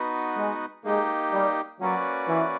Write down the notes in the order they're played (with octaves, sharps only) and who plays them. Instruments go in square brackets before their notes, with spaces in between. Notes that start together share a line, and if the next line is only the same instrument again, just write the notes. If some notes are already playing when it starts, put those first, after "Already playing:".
Already playing: [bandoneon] B3 D#4 F#4 B4
[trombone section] G#3
[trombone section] G#3 [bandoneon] A#3 D#4 G4
[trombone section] G3
[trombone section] F#3 [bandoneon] A#3 C#4 F#4 B4 D5
[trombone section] E3